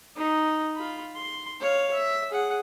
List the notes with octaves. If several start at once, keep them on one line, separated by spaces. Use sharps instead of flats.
D#4
F4 B5
C6
C#5 F5
E5
G#4 F#5